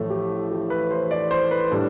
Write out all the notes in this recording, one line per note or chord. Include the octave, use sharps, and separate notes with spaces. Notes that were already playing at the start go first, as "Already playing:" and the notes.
Already playing: A1 A2 F3 A3 A4
G4
G4
B4
C5
D5
C5
B4
A2 G3 D4 A4